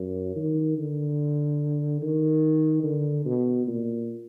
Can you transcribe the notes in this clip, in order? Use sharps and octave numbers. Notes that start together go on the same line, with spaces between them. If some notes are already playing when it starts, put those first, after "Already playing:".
Already playing: F#2
D#3
D3
D#3
D3
B2
A#2